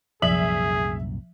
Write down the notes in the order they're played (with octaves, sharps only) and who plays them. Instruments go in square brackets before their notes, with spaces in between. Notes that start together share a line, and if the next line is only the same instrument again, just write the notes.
[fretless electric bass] C2 F#2 A#2 [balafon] F3 [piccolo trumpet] G#4 [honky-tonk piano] E5 F#7